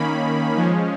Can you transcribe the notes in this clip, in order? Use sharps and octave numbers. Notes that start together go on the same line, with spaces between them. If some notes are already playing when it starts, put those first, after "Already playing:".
Already playing: D#3 A#3 C#4 B5
F3 G#3 C#4